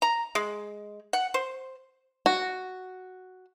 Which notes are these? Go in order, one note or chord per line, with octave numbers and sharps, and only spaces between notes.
A#5
G#3
F#5
C5
F#4